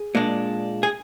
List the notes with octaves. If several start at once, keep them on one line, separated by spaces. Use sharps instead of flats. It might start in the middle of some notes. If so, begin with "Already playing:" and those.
Already playing: G#4
A#2 G#3 D4
G#4